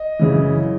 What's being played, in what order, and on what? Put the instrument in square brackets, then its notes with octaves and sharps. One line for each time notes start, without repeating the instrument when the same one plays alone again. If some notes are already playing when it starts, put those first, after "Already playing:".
Already playing: [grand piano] D#5
F#2 C#3 E3